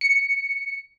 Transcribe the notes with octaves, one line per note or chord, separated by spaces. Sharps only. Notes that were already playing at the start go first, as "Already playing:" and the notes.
C#7